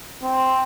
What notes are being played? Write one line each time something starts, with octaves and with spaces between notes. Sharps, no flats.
C4